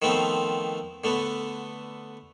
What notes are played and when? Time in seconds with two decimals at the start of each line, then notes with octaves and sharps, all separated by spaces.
0.02 D#3 F3 A3 B3 C4
1.04 D3 A3 B3